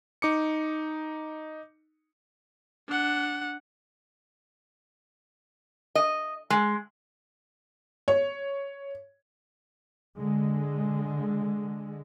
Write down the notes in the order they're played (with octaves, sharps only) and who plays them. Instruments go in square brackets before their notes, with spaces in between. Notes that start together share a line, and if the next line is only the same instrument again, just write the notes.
[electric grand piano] D#4 D6 C#7
[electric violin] D4 F#5
[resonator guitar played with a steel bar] D#5
G#3
[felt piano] C#5
[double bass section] D3 G#3